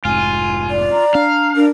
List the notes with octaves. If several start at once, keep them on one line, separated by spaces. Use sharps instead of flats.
F1 G#2 F4 G#5
D5
A#5
D4 F5
D4 A#4